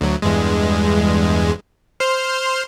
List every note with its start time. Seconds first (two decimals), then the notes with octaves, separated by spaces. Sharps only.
0.01 D2 F#3
0.22 E2 G2 G#3
2.00 C5 C6 F6